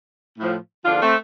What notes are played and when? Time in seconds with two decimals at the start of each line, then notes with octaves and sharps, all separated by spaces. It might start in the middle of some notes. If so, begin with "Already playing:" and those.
0.38 A2 F3
0.85 E2 D3 F3 D4 F4
1.01 A3 C4